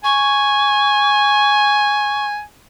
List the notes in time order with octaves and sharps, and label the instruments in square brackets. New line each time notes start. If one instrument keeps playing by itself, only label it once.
[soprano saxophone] G#5 [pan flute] C#6